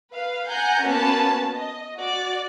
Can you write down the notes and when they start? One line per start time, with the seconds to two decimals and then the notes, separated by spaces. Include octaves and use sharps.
0.13 B4 F5
0.49 F#5 G#5 A#5 G6
0.85 A#3 B3 C#4 F#4 B4 A5
1.54 D#5
2.00 F#4 D5